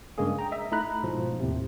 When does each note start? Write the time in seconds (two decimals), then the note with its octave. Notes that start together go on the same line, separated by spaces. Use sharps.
0.18 G2 C#3 G#3 A#3 G#4
0.39 G5 A#5
0.52 D#5 E5
0.72 A3 D#4 E4 A#5 B5 F#6
1.03 G#2 B2 F3
1.40 D#2 A2 C3